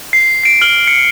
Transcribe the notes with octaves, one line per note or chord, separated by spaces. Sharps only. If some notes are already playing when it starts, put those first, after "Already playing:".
C7
C7 D7
F6 F#7
C#7